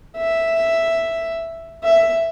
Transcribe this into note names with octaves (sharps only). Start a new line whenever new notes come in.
E5
E5